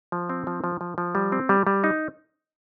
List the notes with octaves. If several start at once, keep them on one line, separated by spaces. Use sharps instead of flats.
F3
C4
F3
F3
F3
F3
G3
C4
G3
G3
D#4